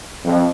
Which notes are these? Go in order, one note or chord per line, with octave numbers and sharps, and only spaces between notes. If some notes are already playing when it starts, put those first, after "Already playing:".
F2